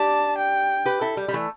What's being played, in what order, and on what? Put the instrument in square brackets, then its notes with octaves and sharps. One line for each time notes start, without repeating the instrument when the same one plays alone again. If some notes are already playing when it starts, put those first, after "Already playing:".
Already playing: [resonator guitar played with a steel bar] D4 G4 [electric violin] A5
[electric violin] G5
[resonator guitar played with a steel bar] G4 B4
E4 A4
G3
G3
E3 A3